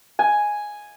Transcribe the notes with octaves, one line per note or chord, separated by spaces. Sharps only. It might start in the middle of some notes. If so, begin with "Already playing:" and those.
G#5